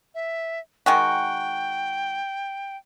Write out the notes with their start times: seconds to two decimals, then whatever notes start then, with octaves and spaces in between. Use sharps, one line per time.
0.15 E5
0.86 D#3 G#3 F#4 G5